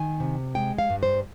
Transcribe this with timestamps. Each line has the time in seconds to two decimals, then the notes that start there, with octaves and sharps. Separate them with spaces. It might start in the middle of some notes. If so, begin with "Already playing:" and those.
Already playing: D#3 G#5
0.20 C3
0.55 G#3 G5
0.78 F5
0.90 G2
1.03 C5